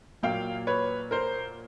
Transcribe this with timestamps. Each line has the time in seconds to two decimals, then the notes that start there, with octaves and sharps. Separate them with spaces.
0.23 A#2 F#3 A#3 F5 G5
0.67 B4 C#5
1.11 A#4 C5